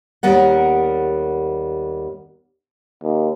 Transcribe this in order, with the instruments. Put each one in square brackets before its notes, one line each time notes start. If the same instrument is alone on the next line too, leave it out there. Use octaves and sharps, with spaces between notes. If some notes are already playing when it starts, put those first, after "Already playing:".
[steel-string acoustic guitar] D#2 G3 B3 A#4 F#5
[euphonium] D#2